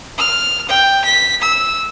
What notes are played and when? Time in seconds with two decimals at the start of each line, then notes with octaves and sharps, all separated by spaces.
0.18 F6
0.69 G5
1.05 B6
1.42 E6